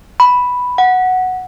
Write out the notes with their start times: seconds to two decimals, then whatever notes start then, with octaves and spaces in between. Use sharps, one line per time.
0.20 B5
0.78 F#5